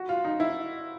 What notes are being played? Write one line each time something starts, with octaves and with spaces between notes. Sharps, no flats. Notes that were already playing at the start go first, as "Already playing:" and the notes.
Already playing: F#4
F4
D#4
E4